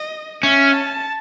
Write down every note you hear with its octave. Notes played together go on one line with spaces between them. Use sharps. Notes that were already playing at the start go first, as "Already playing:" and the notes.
Already playing: D#5
C#4 E5
A5